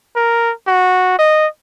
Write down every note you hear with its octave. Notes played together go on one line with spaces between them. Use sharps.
A#4
F#4
D#5